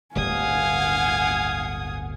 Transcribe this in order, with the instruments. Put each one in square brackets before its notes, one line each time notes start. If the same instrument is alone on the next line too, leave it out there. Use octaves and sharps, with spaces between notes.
[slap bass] D1 G1 G3 [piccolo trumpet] F5 [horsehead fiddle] F#5 G#5 [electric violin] D#6 G#6